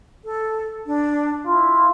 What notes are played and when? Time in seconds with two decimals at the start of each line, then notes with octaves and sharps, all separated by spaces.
0.25 A4
0.86 D4
1.46 E4 F4